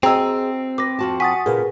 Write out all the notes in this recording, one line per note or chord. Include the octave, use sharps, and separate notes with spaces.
C4 F#4 G#4 D#5 G5 A#5 E6
B4 D6 A#6
F2 F#4 A5
F#5 G#5 C#6 D#6 A6 B6
A#2 C#3 G#4 A#4 B4